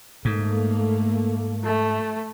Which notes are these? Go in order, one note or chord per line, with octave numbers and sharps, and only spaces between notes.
G#2 A3 A#3
A3